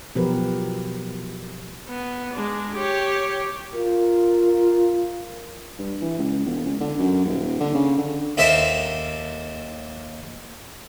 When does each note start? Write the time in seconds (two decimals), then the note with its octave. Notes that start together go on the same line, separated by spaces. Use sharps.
0.15 B2 F3 F#3 G4 A#4 B4
1.89 B3
2.33 G#3 D4
2.74 G4 C#5
3.73 F4 A#4
5.79 G2
6.02 E3
6.19 C#2
6.46 E1
6.66 C#2
6.80 D3
6.99 F#2
7.24 D#1
7.60 D3
7.75 C#3
7.98 D3
8.37 D#2 D#4 A4 A#4 C5 E5